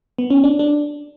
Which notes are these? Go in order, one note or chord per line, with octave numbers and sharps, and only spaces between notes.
B3
C#4
D4
D4